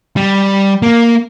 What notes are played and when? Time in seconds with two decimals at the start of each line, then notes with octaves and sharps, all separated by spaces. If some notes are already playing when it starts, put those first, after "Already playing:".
0.17 G3
0.82 A#3